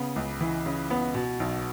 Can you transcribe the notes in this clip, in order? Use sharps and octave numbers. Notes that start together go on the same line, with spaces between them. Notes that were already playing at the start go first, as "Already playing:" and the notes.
Already playing: C#3 B3
C#2
E3
C#3
B3
B2
B1